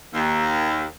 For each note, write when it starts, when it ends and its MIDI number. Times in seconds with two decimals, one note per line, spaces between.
0.14 0.85 39